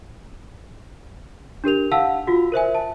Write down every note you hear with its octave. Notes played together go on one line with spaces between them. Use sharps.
D4 G4 A#4 F7
F5 F#5 A5 E6
F4 F#4
A#4 C5 E5 G#5
A5